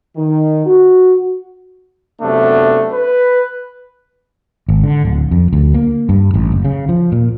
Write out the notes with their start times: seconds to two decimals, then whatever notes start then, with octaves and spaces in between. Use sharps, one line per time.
0.16 D#3
0.66 F#4
2.22 F#2 C3 A3 B3 D4
2.92 B4
4.69 G#1
4.83 D3
5.05 D1
5.31 F2
5.53 D2
5.74 A#3
6.09 G2
6.34 A1
6.52 F#1
6.65 C#3
6.89 F3
7.12 A#2